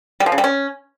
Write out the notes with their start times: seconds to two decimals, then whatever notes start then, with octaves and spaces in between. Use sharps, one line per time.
0.20 G3
0.26 F3
0.32 C#3
0.38 G3
0.44 C#4